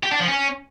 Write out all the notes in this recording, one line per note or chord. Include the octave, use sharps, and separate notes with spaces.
G4
D4
F3
C#4